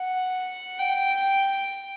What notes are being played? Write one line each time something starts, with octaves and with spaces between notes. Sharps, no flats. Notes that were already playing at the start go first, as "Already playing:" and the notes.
Already playing: F#5
G5